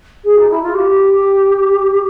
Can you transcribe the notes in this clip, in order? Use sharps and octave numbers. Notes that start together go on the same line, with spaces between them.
G#4
D#4
E4
F4
G4